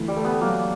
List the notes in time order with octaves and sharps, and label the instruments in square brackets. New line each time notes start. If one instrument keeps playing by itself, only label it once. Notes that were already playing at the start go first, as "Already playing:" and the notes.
Already playing: [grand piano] D2 E3
[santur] G3
[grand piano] A3
[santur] B3
[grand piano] F#3 [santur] A#3